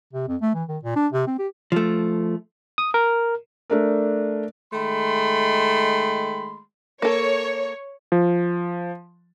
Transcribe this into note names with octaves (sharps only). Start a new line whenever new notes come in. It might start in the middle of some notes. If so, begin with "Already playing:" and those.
C3
F2
A3
E3
D#3
A#2
D4
C3
C4
G4
F3 A3
D#6
A#4
A3 D4 A#4
D#3 G#3 A3 B5 C6
A#3 A4 C#5
F3